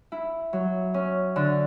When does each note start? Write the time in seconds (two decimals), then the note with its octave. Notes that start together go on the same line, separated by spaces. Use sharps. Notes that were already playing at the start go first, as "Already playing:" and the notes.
0.12 E4
0.53 F#3
0.94 C#4
1.36 D3